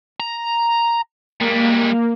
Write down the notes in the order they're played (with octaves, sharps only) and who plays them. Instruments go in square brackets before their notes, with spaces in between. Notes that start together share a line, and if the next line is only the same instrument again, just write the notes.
[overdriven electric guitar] A#5
[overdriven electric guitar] G3 G#3 [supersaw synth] A#3